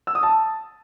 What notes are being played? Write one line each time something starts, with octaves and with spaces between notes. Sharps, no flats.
E6
D#6
A5